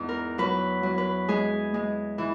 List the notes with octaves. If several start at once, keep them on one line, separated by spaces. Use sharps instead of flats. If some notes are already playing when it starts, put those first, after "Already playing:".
Already playing: E2 G#2
A#4
F#3 B4
F#3
B4
G#3 G#4
G#3
E3